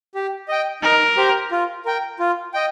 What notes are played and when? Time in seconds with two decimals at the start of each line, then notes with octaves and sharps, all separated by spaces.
0.15 G4
0.48 D#5 G5
0.83 D#4 A#4
1.17 G4 C5
1.51 F4
1.85 A#4 G5
2.19 F4
2.54 D#5 G5